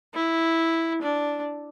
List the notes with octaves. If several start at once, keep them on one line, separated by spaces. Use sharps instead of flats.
E4
D4